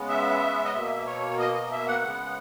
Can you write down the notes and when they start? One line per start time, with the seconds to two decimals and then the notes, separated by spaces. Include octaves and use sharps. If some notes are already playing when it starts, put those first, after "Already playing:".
Already playing: C#3 G#3 B3
0.09 E5
0.65 D#5
0.74 B2 A#3 E5
1.06 C#5
1.39 D#5
1.54 D#5
1.72 E5
1.87 F#5
2.03 C#3 G#3 B3